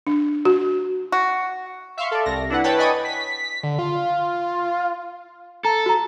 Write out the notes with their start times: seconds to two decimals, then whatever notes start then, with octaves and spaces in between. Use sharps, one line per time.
0.07 D4
0.45 F#4
1.12 F#4
1.97 E5 F5 C6 C#6
2.11 A4 D5
2.25 C2 A#6
2.50 D4 E4 B4 F#5
2.64 B4 C#5 G5 A5 B5
2.78 D5 D#5 G#5 B5 C#6 D#6
3.05 B6
3.63 D3
3.79 F4
5.65 A4 A#5
5.86 F#4 A#5